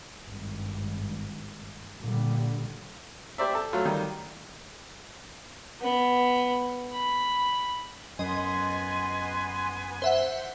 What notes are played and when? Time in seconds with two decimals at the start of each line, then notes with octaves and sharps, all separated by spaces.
0.24 G#1 G2
2.02 A#2 D3 G3
3.38 G4 C5 D5 E5
3.55 A4
3.73 F#3 A3 F4
3.85 D#3 G3
5.81 B3
6.92 B5
8.19 F#2 B3 B4 D#5 G#5 C6
10.02 C5 E5 F#5